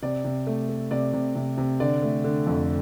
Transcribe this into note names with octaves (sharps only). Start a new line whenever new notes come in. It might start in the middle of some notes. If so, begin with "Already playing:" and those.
C3 D5
C3
A3
A3
C3 D5
C3
C3
C3
D3 D5
A3
D3
F2